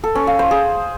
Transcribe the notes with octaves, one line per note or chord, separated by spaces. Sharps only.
A4
C#4
F5
C5
G#4